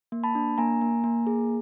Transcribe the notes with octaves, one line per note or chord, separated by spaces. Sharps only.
A#3
A5 B5
D4
A#3 G#5 A#5
A#3
A#3
G#4